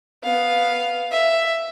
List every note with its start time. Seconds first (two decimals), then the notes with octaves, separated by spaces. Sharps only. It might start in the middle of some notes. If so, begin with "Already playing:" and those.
0.24 B3 F5
1.12 E5